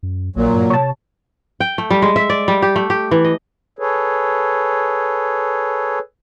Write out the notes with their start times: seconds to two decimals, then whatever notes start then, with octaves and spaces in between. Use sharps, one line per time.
0.03 F#2
0.36 A#1 A#2 F#3 A#3
0.54 G2
0.70 C3 C#5 A5
1.60 G5
1.78 A3
1.91 G3
2.02 G#3
2.16 E5
2.30 D5
2.48 G3
2.62 G4
2.76 A3
2.90 G4
3.11 E3
3.24 D#5
3.79 G#4 A4 B4 C#5